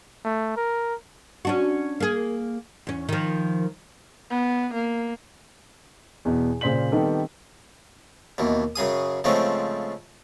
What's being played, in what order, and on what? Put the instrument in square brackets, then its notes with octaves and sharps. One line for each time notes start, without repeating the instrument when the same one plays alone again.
[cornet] A3
A#4
[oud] C#4 D4 F#4
A#3 G#4
E2 C#4
D#3 F3
[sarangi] B3
A#3
[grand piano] E2 B2
A#2 C#3 C5 D5 B6 F#7
D#3 G3 B3 C4 G4 A4
[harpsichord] D#2 B2 E3
F#2 C#3 G#4 D#6
C#3 F3 G#3 A3 C4 C#4